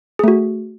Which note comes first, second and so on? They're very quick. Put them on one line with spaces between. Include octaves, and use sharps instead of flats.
G#4 A3 F#4